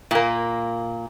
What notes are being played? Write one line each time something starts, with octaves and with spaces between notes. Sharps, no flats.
A#2 A#3